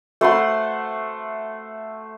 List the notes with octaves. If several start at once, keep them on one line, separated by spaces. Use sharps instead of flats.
A3 C5 F#5 C6